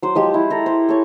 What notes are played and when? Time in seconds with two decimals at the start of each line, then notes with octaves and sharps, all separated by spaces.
0.02 F#3 C5
0.15 F3 G#3 G4
0.34 E4
0.50 A4 A#5
0.66 C5
0.89 A4 C#5